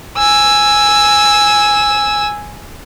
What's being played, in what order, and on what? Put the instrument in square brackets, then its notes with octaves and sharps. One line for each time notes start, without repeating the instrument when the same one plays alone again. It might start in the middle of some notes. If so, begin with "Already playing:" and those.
[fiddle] G#5 E6